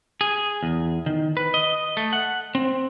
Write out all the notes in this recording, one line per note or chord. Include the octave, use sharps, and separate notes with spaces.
G#4
E2
D#3
B4
D#5
A3
F#5
C4